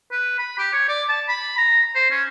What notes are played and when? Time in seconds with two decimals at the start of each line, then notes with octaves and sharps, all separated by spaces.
0.12 B4
0.39 B5
0.58 G4
0.73 C#5
0.89 D5
1.09 A5
1.29 B5
1.58 A#5
1.95 C5
2.11 C#4